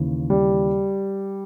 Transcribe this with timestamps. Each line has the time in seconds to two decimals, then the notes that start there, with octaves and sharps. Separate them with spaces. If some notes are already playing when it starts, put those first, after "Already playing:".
Already playing: D#2 C#3 E3
0.30 G3